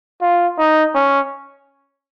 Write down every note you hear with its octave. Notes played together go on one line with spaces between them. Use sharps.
F4
D#4
C#4